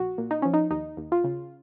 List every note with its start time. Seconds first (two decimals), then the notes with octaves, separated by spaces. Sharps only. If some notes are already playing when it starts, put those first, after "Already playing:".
Already playing: A#1 F#4
0.18 A#2
0.31 D#4
0.42 F3 C#4
0.54 D#4
0.71 D#2 D#4
0.97 D#2
1.12 F4
1.24 C#3